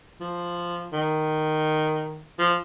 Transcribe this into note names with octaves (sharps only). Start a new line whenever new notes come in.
F3
D#3
F3